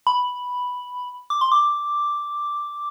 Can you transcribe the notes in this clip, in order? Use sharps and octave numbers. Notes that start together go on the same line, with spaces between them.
B5
D6
C6
D6